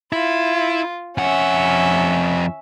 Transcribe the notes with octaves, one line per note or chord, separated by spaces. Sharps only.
E4 F4
F2 C#4 E5 F#5